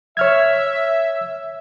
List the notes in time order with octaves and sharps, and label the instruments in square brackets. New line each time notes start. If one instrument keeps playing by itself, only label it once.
[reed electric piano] C#5 F6 G#6 [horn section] E5